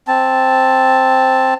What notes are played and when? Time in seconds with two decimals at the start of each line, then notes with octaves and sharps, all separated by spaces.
0.08 C4 A5